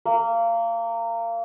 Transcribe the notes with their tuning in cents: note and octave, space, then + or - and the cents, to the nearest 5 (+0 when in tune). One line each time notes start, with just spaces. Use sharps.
A#3 -25